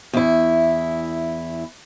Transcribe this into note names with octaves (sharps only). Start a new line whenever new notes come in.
E2 E4